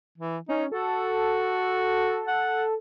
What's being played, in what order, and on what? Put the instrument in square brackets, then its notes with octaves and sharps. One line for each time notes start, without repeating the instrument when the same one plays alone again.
[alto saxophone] E3
[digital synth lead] C#4 [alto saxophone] D#4
[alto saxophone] F#4 [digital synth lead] A4
[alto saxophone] F#5